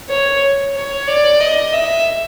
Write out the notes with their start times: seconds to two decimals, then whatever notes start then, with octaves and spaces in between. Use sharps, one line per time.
0.09 C#5
0.75 C#5
1.07 D5
1.40 D#5
1.73 E5